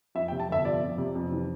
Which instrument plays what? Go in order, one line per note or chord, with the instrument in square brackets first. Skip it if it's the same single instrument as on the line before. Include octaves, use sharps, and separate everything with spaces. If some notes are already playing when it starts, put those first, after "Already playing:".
[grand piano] F2 E5
G5
C3
A5
G1 E5
F3 D5
F2
C3
F2
E3